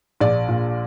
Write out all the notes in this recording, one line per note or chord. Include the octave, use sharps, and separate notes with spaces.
A#1 D5
A#2